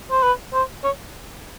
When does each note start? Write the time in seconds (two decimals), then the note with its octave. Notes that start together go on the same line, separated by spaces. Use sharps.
0.11 C5
0.23 B4
0.53 C5
0.84 C#5